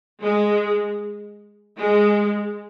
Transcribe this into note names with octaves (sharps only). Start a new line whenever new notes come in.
G#3
G#3